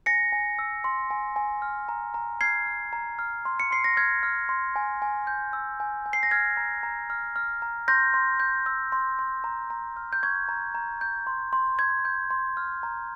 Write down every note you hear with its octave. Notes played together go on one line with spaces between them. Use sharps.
G#5 A#6 C#7
G#5
E6
C6
G#5
G#5
F6
A#5
A#5
F6 G#6 C7
F6
A#5
F6
C6
C#7
C6 C7
A#6
F6 G#6
F6
C6
G#5
G#5
G6
E6
G#5
G#5
C7
A#6
F6 G#6
A#5
A#5
F6
F6
A#5
C6 G6 A#6
C6
G6
E6
C6
C6
A#5
A#5
F6
G6
C#6 G#6
A#5
A#5
G6
C6
C6
G6 G#6
G6
C6
F6
A#5